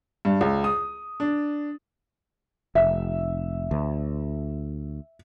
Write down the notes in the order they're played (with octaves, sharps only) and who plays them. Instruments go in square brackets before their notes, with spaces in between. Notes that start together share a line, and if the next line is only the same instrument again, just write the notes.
[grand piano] G2
C#2
D#6
D4
[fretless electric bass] F1 [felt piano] E5
[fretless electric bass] D2